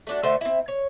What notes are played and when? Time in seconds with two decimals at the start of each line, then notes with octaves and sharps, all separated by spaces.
0.07 A3 D4 F#4
0.23 D3 A3 C5 E5
0.41 C4 E4
0.68 C#5